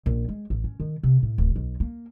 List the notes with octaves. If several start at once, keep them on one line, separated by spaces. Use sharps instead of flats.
A#1
G#3
A1
C#4
D#3
C3
A2
D1
B1
A#3